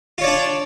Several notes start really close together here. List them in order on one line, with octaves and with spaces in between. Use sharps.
F4 C#5 D5 D4